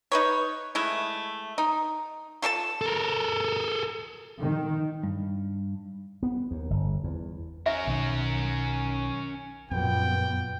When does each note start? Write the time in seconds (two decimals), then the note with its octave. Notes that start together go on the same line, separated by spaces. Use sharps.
0.12 D#4 B4 C#5
0.75 G#3 A3 E4
1.58 D#4
2.42 F4 A4 C#5 A5
2.81 A4 A#4
4.41 D#3
5.03 G2
6.23 B3
6.51 D#2
6.70 G1
7.04 E2
7.66 C#4 A#4 E5
7.87 B1 D#3
9.71 F#1 F2 A#2 F#3 B3 G5